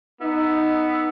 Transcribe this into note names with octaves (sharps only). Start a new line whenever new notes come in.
B3 D#4 E6